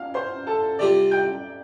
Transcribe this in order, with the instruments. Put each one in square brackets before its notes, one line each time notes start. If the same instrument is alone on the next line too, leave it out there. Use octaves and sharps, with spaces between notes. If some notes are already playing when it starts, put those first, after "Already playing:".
Already playing: [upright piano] F5 F6
C5 C6
A4 A5
[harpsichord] C3 G3 F4 [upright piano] D5 D6
[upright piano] G5 G6